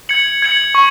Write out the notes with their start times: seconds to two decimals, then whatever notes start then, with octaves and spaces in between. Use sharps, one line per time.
0.09 G#6 C#7 F#7
0.42 G#6 C#7 F#7
0.75 C#6